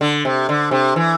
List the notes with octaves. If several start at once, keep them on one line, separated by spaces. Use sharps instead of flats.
D3
C3
D3
C3
E3